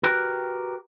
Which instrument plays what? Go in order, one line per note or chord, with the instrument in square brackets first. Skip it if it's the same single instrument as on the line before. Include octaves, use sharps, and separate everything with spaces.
[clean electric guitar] F#4 G4 A#4 B4 G5